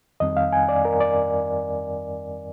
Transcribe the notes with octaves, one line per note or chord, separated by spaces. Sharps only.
F2 D#3 G3 C4 D#4 D#5
F5
G#5
D5
A#4
D5